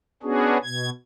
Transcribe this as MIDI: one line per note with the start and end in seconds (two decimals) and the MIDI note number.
0.23 0.58 59
0.23 0.58 61
0.23 0.58 62
0.23 0.58 66
0.23 0.58 68
0.64 0.90 47
0.64 0.90 92